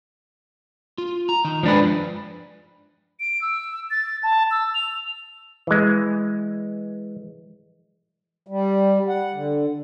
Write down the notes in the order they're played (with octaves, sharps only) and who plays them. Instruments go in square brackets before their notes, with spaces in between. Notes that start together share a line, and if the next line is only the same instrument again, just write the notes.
[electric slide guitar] F4
A#5
D#3 D#4
[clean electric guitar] F3 D4 B4 [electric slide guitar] G#3
[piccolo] D7
E6
A6
A5
E6
F7
[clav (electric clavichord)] E3 G#3
[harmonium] G3
F#5
D3